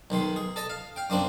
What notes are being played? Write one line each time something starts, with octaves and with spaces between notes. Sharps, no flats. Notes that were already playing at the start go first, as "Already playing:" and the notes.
B1 D#3 G#3 C6
G#4
A4 D#5 A5
F5
F5 G5
F#2 G#3 A#3 C4 D4